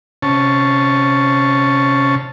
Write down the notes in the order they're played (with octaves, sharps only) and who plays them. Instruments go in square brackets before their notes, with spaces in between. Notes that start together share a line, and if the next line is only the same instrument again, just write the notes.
[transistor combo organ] C3 C#4 A5